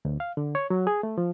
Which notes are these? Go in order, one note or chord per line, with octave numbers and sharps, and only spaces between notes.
D2
F5
D3
C#5
F#3
G#4
A3
F3